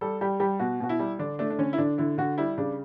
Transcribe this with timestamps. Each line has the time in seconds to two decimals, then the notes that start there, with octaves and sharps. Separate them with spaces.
0.01 G3 A4
0.21 G3 G4
0.40 G3 G4
0.60 B2 F#4
0.80 B2 F#4
0.89 E4
0.99 G3
1.19 D3 D4
1.39 A3 D4
1.50 D4
1.58 D3 C#4
1.73 E4
1.78 D3 D4
1.98 D3 E4
2.18 D3 F#4
2.38 G3 E4
2.58 C#3 D4